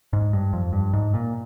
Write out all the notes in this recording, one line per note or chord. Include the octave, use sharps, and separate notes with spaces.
G#2
G2
F2
G2
G#2
A#2